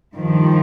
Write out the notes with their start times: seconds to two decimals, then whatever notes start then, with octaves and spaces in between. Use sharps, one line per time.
0.17 G2 D#3 F3